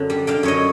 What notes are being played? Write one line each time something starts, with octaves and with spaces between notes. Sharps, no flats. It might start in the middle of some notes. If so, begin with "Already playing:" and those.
Already playing: F#2 D3
G3
D3 F5 G5
F#2 C#5 D#5